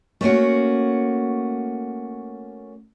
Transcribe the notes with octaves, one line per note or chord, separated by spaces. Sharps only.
A3 A#3 C#4 F#4